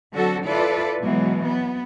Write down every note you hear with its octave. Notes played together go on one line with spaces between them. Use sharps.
D3 F#3 C4 F#4 A4
E4 F4 A4 B4 D5
B2 E3 F#3 G#3
B3